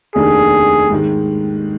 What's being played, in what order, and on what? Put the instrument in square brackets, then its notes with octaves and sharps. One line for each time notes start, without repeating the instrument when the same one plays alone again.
[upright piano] F1 D#2 D#3 A#3 D4 [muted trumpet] G#4
[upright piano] G#2 D#3 G#3